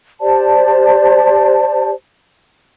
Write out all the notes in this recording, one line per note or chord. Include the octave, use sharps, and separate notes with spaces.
G4 C5 D5 A5